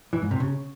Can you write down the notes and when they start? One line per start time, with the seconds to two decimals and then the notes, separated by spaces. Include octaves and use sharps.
0.13 E3
0.22 G#2
0.31 C3
0.40 C#3